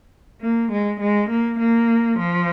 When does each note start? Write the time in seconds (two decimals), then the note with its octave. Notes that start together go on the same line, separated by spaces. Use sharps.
0.42 A#3
0.72 G#3
1.01 G#3
1.30 A#3
1.59 A#3
2.19 F3